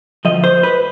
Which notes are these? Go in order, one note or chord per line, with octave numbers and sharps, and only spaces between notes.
D2 C3 F3 D#5
C5
B4